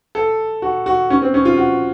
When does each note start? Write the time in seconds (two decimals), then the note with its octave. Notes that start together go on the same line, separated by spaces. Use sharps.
0.15 A4
0.62 F#4
0.86 F#4
1.10 C#4
1.22 C4
1.34 C#4
1.45 F4
1.57 F#4